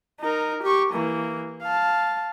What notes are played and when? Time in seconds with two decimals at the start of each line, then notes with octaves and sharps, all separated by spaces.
0.20 D#4 A#4
0.63 G4 C#6
0.92 E3 A#3
1.62 F5 A5